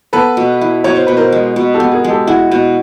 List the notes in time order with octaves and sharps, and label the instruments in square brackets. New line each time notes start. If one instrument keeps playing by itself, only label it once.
[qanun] B3 [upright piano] A4 B4
[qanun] B2
E4
[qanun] B2 [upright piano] C#5
[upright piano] C5
[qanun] B2 [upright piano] B4
[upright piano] A#4 C5
[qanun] G#3
B2
[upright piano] G4 A4
[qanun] B3
[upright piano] G#4 A#4
[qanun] G#3
[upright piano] G4 A4
[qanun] E4 [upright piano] F#4 G#4
[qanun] B2